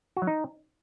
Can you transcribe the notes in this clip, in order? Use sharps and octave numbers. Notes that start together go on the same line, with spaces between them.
F#4
F#3
D#4